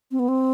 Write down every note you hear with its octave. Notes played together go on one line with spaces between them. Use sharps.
C4
B3
C4